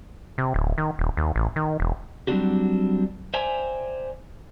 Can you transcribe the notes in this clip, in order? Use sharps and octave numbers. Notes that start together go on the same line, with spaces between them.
C3
D1
D#3
D#1
D#2
A1
D#3
E1
F#3 G3 C4 D4 F#4 G4
C5 D5 E5 G5 G#5 A#5